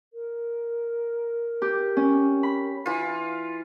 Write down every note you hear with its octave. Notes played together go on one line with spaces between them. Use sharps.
A#4
G4
C#4
B5
E3 F4